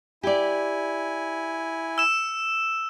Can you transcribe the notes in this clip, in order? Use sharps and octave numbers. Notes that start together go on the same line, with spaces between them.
E4 G4 D5 G#5
E6 E7